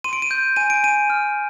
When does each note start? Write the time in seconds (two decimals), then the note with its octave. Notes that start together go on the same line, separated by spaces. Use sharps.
0.04 C6 D#7
0.13 D7
0.22 D#7
0.31 G6
0.56 G#5 D#7
0.70 D7
0.83 G#5 D#7
1.10 F6